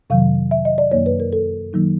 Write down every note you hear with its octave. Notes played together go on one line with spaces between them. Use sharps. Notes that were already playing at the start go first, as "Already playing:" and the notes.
F2 C3 D#3 F#3 F5
E5
D#5
D5
F#2 D#3 F#3 A#3 D#4 C#5
B4
A#4
A4
D#3 F#3 A#3 D#4